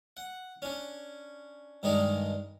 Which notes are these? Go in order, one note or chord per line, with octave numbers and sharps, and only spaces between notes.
F#5
C#4 D4
G2 D#3 G#3 D4 D#4